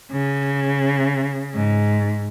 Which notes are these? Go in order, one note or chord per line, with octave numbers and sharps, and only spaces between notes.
C#3
G#2